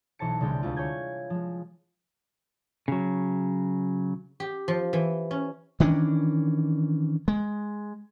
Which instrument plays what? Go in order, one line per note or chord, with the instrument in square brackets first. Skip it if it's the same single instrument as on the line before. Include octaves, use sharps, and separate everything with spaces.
[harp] B1 E3 C5 A5 C#7
C2 D3 G#3 G5
D2 G#3 E4 F4
C#5 G#5 G6 G#6
F3 G#3
[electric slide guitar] C#3 F#3
[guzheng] G4
F3
E3
C#4
[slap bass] D#3 E3 C#4 D4
G#3